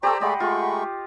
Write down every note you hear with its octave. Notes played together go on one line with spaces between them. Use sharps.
G4 A4 C5 D5 G5 A#5 C#6 E6
G#3 A3 D5 D#5 F#5 B5 C6
G#3 A3 F4 C#6